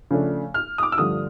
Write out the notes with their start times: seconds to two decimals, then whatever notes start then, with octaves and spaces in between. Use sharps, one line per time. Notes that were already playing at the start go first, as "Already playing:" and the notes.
0.11 C#3 F3 A3 D4
0.54 F6
0.78 D#6
0.83 D6
0.92 E6
0.97 G2 D3 F3 A3 D4 D#6